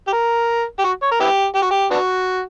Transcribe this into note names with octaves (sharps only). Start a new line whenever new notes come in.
G4
A#4
G4
F#4
C#5
A#4
B3 E4 G4
G4
F#4
G4
B3 D4 F#4